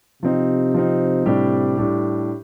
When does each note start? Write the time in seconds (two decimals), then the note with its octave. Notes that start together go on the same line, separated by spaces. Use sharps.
0.22 C3 F3 C4 D#4
0.74 F3 C4 D#4
1.26 A2 C3 G3 D4 G4
1.77 A2 G3 D4 G4